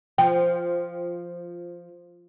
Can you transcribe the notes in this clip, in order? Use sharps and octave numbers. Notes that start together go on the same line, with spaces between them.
F3 G5